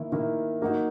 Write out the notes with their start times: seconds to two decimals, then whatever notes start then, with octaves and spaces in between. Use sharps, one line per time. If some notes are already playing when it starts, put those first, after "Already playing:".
Already playing: D#3 A#3 E4
0.12 D#3 A#3 E4
0.62 F#3 A#3 D#4 F#4